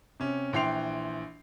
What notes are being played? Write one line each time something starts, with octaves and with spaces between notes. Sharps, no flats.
C3 C#4
A#1 E3 G5 C6 C7 F7